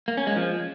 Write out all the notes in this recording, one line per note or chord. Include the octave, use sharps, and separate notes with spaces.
A#3
C#4
G#3
F3